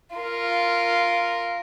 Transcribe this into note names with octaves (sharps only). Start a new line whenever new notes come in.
F4 A#4